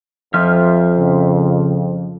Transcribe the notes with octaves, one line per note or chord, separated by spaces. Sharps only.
F2 F3 F4 E5 F6
C#3